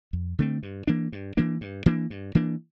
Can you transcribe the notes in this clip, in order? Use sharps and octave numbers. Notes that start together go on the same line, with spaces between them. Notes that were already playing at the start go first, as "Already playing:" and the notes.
F2
D3 A3 C4
G2
E3 A#3 D4
G2
E3 A#3 D4
G2
E3 A#3 D4
G2
E3 A#3 D4